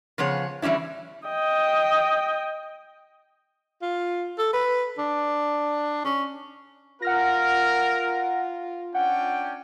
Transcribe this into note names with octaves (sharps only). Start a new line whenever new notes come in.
C#3 F3 B3 G#4 C#5
E3 G3 C#4 D4 E4
D#5 G5
F4
A4
B4
D4
C#4
F4 A#4 F#5 F6 A#6
C#4 D4 F#5 G5